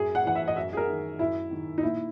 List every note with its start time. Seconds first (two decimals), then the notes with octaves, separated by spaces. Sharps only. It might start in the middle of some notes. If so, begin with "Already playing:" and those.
Already playing: F#2 G#4
0.15 F#5
0.25 E3 F#5
0.35 E5
0.48 D#5
0.56 F#2 E5
0.73 G#4
0.77 A#4
0.88 D#3
1.19 F#2 E4
1.51 D#3
1.78 D#4
1.83 A#2 E4